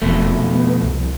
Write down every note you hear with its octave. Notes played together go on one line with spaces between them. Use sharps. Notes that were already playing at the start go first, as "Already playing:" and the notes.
E1 F2 B2 A3
B3
C2